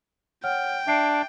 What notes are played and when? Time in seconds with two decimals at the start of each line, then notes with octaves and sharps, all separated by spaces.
0.43 C#5 F#5 G5 F6
0.87 D4 E5 C7 D7